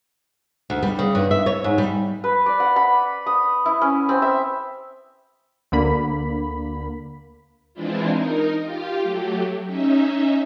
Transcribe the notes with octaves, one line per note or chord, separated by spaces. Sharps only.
D2
G3
C#3
G2
E5
C#5
G#2
G3
B4
D5
F#5
B5
D#6
E4
C#4
C4
E5
D2 D3 A#3 B5
E3 G#3 C4 D4 E4 F4
D#4 A#4
F4 G4 F5
F#3 A3 G4
C#4 D#4 E5